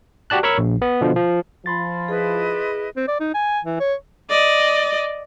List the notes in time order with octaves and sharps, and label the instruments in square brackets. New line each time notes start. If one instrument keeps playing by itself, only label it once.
[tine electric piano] F#4 G4 D5 A5 F#6
A#4 C#5 B5 C#6 E6
A#1
B3
B2 D3 F3
F3
[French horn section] F3 [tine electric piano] B5 C6 A6
[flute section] E4 B4 D#5 [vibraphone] G#4
[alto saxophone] C4
D5
D#4
G#5
E3
C#5
[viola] D5 D#5